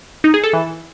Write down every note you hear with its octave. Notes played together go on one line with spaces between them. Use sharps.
D#4
G#4
A4
E3